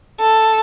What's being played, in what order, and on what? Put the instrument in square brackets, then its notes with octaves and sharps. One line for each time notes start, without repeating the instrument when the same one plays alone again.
[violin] A4